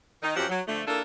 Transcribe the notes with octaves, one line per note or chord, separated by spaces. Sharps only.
D#3 D#4
F#2 F3 F#3 C4 G4 F#5
F#3
D3 F3 A3
A#3 D4 E4 F4 A4 A#4